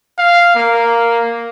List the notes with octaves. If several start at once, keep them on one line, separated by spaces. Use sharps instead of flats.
F5
A#3